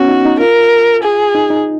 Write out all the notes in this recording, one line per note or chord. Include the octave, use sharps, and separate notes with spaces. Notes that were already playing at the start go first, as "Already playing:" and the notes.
Already playing: B3 C#4 F#4
D#4
D#4
F4 A#4
G#4
D#4
D#4